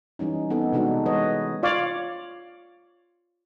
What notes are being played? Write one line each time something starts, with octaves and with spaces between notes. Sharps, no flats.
E3 G3 C#4 D#4
B3 C4 D#4 A4
C3 G#3 D4 D#4 F#4
E3 G#3 B4 C#5 D#5
F4 C#5 D5 F5